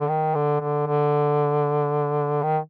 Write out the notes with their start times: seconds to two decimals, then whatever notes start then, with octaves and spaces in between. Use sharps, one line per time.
0.01 D3
0.09 D#3
0.35 D3
0.61 D3
0.87 D3
2.43 D#3